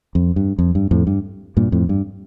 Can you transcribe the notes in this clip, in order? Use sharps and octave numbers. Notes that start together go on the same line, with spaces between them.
F2
G2
F2
G2
F2 A2
G2
G2 A#2
F2 A2
G2